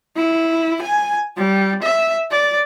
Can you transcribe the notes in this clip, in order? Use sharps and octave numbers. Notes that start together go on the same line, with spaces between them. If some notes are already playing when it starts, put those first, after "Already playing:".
E4
G#5
G3
E5
D5